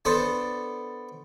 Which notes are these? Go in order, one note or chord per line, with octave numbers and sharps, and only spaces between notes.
B3 D4 A4 C5